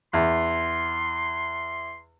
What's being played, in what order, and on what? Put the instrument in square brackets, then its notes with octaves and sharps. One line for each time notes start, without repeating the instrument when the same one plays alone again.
[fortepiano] E2 [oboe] C6